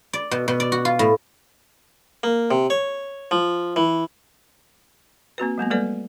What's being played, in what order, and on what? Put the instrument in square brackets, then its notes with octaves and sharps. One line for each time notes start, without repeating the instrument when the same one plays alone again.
[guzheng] D5
B2
B2
D5
F#4
F4
A2
[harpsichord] A#3
C3
C#5
F3
E3
[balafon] A#3 C4 F#4 B4
F#3 G#3 A#3 B3
G3 G#3 A#3 A4 B4 D5